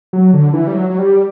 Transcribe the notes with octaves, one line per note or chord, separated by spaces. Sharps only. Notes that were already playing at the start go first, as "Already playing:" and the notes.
F#3
D3
E3
G3
F#3
F#3
G3